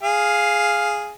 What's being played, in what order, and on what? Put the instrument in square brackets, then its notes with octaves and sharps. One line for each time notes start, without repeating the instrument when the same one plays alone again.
[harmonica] G#4 F5